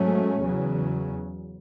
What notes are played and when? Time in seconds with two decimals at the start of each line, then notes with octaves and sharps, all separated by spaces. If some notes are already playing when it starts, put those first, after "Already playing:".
Already playing: G#2 F#3 A3 C#4
0.41 E2 C#3 F#3